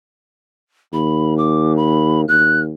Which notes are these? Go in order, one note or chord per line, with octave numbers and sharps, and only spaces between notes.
D#2 B5
D6
B5
D#2 F#6